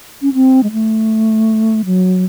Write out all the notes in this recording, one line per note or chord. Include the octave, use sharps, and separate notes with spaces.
C#4
C4
G#3
A3
F#3